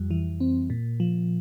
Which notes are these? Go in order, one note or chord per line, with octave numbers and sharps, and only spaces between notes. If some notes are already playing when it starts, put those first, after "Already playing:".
Already playing: F2 G3
E3
C4
A#2
F3